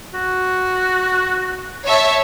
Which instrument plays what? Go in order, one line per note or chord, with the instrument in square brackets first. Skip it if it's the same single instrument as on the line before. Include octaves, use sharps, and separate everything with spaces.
[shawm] F#4
[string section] C#5 E5 A5